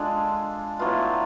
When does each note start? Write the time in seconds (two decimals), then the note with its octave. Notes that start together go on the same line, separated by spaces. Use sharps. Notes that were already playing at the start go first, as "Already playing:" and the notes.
Already playing: G#3 D4 F4 A4
0.79 A2 F#3 B3 F4